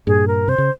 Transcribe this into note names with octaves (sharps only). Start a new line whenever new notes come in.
G2 A#2 G#4
A#4
C3 C5
C#3